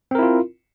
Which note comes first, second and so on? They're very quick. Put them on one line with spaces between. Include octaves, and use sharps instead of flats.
C4 A#4 E4 F4